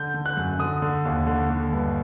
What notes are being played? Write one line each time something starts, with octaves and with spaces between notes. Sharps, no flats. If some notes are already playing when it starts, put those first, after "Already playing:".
Already playing: D3 G6
D3
F#6
F#2
D3 D#6
D3
D#2
D3
D3
G2